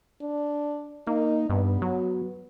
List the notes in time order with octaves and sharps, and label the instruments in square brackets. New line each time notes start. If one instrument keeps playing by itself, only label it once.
[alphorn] D4
[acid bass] A#3 [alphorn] D#4
[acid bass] G2 [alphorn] B3
[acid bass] F#3